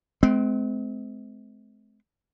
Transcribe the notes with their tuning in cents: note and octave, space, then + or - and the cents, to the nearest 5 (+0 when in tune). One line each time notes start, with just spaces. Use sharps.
G#3 +40 C4 -30